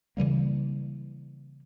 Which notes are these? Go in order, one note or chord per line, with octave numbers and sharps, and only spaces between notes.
C#3 E3 G3 A#3